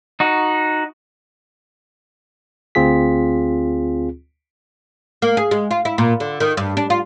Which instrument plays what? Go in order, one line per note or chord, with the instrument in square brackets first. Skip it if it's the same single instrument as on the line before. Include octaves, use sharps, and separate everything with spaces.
[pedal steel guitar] D#4 F#4
[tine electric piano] D2 C4 F4 G#4 B6
[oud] A#3
G#4
G#3
F4
E4
A#2
D3
D#3
G2
D4
F4